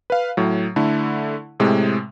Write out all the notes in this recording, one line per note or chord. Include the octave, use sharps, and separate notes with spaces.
B4 F5
A2 F#3
D3 A3 E4
A2 C3 G#3